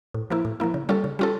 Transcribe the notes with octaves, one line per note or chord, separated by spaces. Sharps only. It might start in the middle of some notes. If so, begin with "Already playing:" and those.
A2
F3 A#3 E4
A2
F3 A#3 E4
C#3
G3 C#4 F4 A4
C#3
G3 C#4 F4 A4